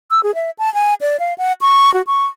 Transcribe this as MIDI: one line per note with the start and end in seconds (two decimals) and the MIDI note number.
0.11 0.21 88
0.23 0.34 68
0.35 0.50 76
0.59 0.72 81
0.74 0.94 80
1.01 1.17 74
1.19 1.34 77
1.38 1.52 78
1.61 1.92 85
1.94 2.02 66
2.07 2.26 85